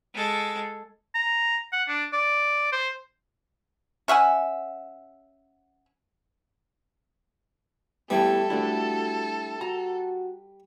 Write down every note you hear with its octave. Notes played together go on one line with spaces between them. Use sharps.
G#3 A4
A#5
F#5
D4
D5
C5
C#4 E5 F#5 G#5
G3 A3 B3 E4 G4 A4
A3 D4 E4 F#4
F#4 A#5